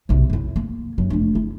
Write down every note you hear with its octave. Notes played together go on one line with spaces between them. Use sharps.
B1 C3
F#2 E4
A#3
F#2 F#3
F1 D4
E4